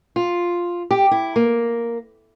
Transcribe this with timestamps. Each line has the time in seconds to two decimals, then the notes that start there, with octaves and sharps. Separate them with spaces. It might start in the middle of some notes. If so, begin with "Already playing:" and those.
0.16 F4
0.91 G4
1.11 E4
1.36 A#3